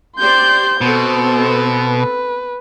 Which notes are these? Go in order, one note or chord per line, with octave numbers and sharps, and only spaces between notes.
G4 C5 D5 C6 G6
B2 B3 C4 A4 C5
B4